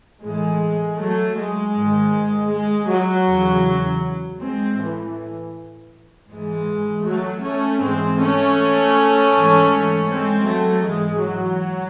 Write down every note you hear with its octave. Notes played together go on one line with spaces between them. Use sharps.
A2 E3 G#3
F#3 A3
G#3
G#2 D#3
G#3
F#3
E2 C#3 E3
G#3 C4
A2 E3
G#2 E3 G#3
F#3 A3
A3 C#4
G#2 E3 G#3 C4
A3 C#4
G#2 E3
G#3 C4
F#3 A3
G#2 E3 G#3
F#3